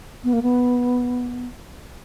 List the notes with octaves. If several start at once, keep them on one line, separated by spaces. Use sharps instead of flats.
B3
A#3
B3